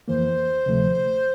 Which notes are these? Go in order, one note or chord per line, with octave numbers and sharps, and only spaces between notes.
F2 E3 A#3 C5
D2 C3 F3 A3